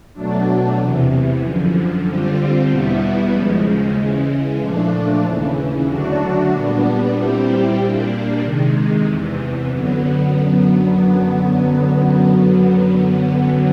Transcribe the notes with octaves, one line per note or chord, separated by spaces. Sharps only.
B2 F#3 A3 D4
E2 C3 E3
F#2 D3 F3
D3 G3 C4 F4
E2 B2 G3 B3 E4
D#2 C#3 F3 G#3
C#3 E3 G#3
A#2 F3 A3 D4
D#2 C#3 E3
D3 F#3 A3 D4 F#4
A#2 G3 B3 D4
A#2 G3 C4 E4 G4
A#2 G3 A#3 D4
C3 D#3 G#3
E2 C3 E3
F#2 D3 F#3 B3